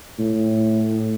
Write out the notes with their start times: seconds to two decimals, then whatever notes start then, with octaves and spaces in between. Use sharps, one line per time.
0.19 A2